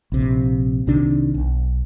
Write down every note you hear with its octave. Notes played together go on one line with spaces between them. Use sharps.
A#1 C3
C2 C3 D#3 D4
B1